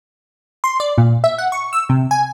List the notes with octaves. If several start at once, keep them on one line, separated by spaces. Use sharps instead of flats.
C6
D5
A#2
E5
F#5
C#6
E6
C3
G#5